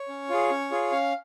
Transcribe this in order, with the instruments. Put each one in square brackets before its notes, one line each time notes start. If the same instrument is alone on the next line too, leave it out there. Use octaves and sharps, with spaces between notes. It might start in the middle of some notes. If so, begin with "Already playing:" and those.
Already playing: [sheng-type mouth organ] C#5
C#4
F4 G#4
C#4
F4 G#4
C#4 F5